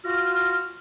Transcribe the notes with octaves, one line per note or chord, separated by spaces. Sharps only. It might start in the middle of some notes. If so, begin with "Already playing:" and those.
F4 F#4 F6